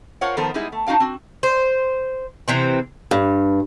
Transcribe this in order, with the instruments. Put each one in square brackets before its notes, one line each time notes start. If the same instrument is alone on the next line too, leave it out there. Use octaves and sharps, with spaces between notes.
[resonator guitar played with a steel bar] F4 A#4 C5 C#5 F5 F#5
D#3 F3 B3 A4 A#4 C5
G3 G#3 D#4 E4 G#4
A3
D4 D#4 F#4 F5 G5
C4 F#4
[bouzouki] C5
C3 E3 C4
[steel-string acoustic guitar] G2